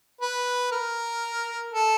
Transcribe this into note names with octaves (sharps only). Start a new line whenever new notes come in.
B4
A#4
A4